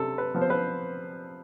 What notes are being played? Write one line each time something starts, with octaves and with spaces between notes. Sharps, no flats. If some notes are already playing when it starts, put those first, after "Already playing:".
Already playing: C3 A4
B4
F3 B3
C5
B4